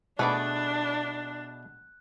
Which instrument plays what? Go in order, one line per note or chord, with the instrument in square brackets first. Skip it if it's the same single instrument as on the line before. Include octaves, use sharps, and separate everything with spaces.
[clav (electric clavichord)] B2 G#4 [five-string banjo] A3 B4 D5 [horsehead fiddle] D4 [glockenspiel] F#6